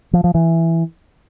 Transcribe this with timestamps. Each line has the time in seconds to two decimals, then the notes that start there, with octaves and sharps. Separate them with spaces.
0.13 F3
0.24 F3
0.35 E3